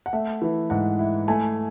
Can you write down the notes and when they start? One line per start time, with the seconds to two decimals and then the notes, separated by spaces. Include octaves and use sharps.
0.06 F#5
0.13 A3 E5
0.42 E3
0.70 G#2 F#5
0.99 E4
1.28 A3 G#5